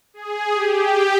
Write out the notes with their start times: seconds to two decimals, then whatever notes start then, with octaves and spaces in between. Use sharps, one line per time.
0.14 G#4
0.52 G4